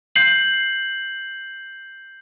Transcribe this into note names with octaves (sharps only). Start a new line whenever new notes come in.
G6 C7 F#7